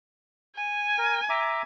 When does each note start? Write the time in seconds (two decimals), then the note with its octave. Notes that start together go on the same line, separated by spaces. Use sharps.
0.56 G#5
0.98 A#4
1.29 E5 A#5 D6